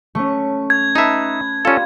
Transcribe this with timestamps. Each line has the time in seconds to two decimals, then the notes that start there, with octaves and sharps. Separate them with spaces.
0.15 A3 C#4 C#6
0.70 G#6
0.95 D#4 B4 E5 A5
1.65 G3 C#4 F4 A4